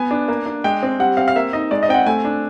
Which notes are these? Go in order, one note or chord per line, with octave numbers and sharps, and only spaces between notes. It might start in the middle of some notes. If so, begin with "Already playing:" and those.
Already playing: B3 G#5
D4
A#3
D4
G#3 G5
C4
G3 F#5
C4 F5
F5
A#3 E5
D#4 D#5
G#3 D5
D#5
C4 G5
F#5
A3 G#5
D4